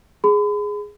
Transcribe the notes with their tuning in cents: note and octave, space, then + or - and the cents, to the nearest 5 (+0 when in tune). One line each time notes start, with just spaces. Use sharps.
G#4 +0 B5 +40